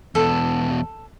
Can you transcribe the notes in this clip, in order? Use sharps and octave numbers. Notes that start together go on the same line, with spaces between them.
E2 B2 A4